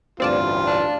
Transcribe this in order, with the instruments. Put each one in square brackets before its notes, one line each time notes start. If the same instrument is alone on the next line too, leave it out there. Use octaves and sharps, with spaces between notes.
[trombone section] A1 D2 G2 [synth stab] C4 D5 A5 [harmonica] F4
[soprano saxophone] D4